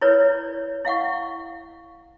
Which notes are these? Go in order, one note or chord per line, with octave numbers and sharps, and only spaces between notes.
E4 F4 A#4 B4 C#5 D5
E4 F5 F#5 C#6